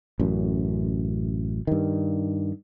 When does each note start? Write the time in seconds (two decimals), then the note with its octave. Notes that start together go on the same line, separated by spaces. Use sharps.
0.20 A1 F#2
1.67 G2 D#3